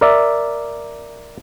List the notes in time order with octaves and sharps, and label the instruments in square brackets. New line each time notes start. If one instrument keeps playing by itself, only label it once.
[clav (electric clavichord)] A#4 D5 E5